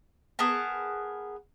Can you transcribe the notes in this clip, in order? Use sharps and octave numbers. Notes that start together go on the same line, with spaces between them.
B3 G#4 A#4 A5